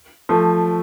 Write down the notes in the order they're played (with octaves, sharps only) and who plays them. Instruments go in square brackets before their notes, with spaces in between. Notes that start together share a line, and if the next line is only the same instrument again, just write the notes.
[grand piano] F3 A3